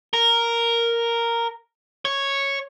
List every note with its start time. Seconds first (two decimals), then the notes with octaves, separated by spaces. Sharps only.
0.13 A#4
2.05 C#5